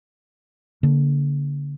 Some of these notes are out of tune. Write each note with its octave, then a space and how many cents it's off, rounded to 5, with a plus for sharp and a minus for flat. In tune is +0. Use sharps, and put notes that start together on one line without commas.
D3 -35 A#3 +0